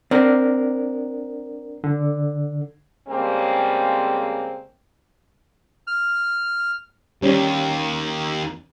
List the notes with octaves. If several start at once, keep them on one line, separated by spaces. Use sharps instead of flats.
C4 D4 A#4
D3
C#3 G3 G#3 A#3 C4
F6
D#2 G3 C#4